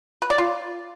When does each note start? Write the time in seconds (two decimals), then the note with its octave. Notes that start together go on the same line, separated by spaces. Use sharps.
0.22 B4
0.30 D5
0.38 F4